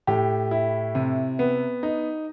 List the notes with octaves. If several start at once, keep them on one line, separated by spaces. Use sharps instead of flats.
A2 G4
E4
C3
B3
D#4